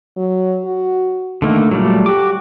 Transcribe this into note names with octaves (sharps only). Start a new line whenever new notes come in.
F#3
F#4
D3 D#3 A3 A#3
A#2 F#3 G3 A3
F#4 G4 D6